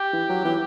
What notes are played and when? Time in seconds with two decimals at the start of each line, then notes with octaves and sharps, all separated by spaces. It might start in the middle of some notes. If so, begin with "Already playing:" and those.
Already playing: G4
0.13 E3
0.29 F#3
0.44 E3